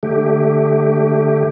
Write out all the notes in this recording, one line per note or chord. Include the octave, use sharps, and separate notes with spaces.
D3 A3 G4